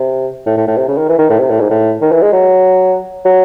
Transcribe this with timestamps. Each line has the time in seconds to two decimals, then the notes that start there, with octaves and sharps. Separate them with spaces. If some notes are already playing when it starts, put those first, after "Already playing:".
Already playing: C3
0.46 A2
0.57 A2
0.68 A2
0.77 C3
0.88 C#3
0.98 D#3
1.09 E3
1.18 D#3
1.30 A2
1.39 C3
1.50 A2
1.60 G#2
1.70 A2
2.01 D#3
2.12 E3
2.22 G#3
2.33 F#3
3.25 F#3